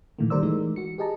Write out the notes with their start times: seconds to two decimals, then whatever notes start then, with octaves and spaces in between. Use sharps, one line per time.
0.19 A#2 D#3 E3 A3 A#3
0.30 D#3 G3 A#4 C5 D5 E6
0.42 E3 G#3 A3 D#4
0.76 F#4 C#7
0.98 G4 G#4 D#5 A5 A#5